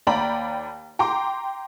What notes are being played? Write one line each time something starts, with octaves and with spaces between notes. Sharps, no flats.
D#2 D5 G5 A#5 B5 F#7
G5 A#5 C6 D6